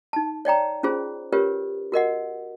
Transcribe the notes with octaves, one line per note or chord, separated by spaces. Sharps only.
D#4 A5
C#5 D5 G5 A#5
C#4 F4 G#4 C5
C#4 F4 G4 A#4 B4 C#5
F#4 A#4 D#5 F#5